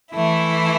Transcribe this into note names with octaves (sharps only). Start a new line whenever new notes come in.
E3 A3 E4